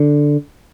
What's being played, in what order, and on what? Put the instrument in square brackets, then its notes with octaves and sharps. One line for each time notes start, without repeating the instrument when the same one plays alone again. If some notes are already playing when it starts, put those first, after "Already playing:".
Already playing: [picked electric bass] D3